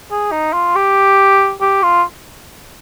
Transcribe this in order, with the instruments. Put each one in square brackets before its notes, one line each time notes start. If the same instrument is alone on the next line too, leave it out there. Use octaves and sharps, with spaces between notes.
[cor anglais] G#4
D#4
F4
G4
G4
F4